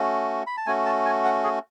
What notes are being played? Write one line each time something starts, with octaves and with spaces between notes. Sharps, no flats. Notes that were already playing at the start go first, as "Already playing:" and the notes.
Already playing: A3 C#4 F#4
B5
A5
A3 C#4 F#4 G#5
A5
G#5
F#5
G#4